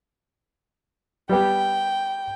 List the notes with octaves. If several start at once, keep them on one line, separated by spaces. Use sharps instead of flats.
G3 B3 G4 G5